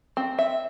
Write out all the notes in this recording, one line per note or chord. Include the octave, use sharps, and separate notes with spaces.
C4
E5